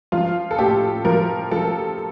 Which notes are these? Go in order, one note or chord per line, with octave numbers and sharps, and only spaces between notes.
F3 F4
A4
A2 G4
F3 A#4
F3 A4